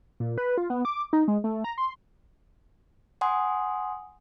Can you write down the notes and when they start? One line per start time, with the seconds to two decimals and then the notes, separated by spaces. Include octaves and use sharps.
0.20 A#2
0.38 B4
0.58 F4
0.70 B3
0.85 D6
1.13 D#4
1.28 G#3
1.44 A3
1.64 A#5
1.78 C6
3.21 F#5 G#5 C6 D#6